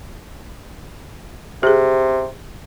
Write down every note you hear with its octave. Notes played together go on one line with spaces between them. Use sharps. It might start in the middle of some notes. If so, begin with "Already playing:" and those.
C3 G4 G#4